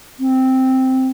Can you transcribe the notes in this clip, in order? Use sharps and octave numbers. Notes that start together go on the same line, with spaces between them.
C4